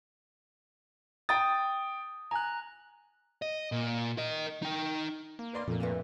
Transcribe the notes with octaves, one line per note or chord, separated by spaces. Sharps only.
G5 D#6 A6
G#5 A#5 F#6
D#5
A#2
A#4 D#5
D#4 G5
A#3
B4 D5 C6
F2 A#2 A3 A#3
E2 G2 E3